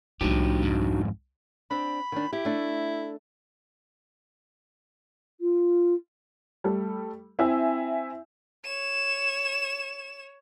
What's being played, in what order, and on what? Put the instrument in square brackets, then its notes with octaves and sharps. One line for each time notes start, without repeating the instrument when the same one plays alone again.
[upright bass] C2 G#3 [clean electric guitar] A2 F3 G4 [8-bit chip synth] D4 D#4 F#4
[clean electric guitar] F2 G#2
[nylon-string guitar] C4 D4 [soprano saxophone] B5
[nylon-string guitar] D#3 D4
[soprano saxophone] E4 [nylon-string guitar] G4
[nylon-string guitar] A3 D4
[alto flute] F4
[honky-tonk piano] G3 A3 A4
C4 E4 E5 G#5 E6
[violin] C#5 E7